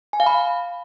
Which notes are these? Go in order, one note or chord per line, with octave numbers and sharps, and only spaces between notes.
G#5
F5
B5